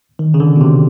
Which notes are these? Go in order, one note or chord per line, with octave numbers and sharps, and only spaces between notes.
D#3
C#3
D3
B2
C3